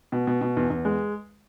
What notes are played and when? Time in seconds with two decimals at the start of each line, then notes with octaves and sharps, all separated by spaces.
0.12 B2
0.27 B2
0.41 B2
0.57 E2
0.70 E2
0.85 G#3